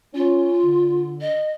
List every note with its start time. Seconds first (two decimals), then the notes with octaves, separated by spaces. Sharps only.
0.14 C#4 F4
0.65 D3
1.20 D#5